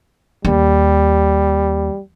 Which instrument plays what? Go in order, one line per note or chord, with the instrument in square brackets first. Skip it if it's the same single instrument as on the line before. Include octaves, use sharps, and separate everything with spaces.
[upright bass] D#2 [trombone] G3